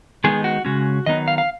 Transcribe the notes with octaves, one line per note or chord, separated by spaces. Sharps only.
D#3 G#3 B3 D#4 G#4
F#4
C#3 G#3 C#4 F#4
D#3 F#3 B3 D#4 D#5
F5
F5